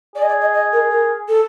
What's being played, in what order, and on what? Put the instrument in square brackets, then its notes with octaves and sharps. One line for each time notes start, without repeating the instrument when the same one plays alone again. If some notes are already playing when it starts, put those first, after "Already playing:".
[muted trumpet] G#4 [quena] D5
[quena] D#5
D5
D#5
D#5
A#4
A#4
A4